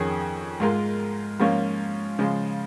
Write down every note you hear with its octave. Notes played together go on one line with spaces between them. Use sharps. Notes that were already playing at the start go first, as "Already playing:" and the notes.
Already playing: F2 D#3 C#4 G#4
G#2 G#3 F4 A#4
G#2 F3 A#3 C#4
C#3 F3 G#3